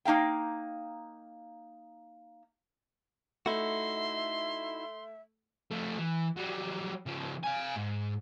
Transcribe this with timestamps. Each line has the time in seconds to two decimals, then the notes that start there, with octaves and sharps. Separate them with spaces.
0.05 A#3 D#4 F5 G5
3.46 A3 D#4 E4 F#4 E5 C6
5.71 F3 A3
5.98 E3
6.37 F#3 G3
7.06 C#3 F3
7.44 F5 G#5
7.77 G#2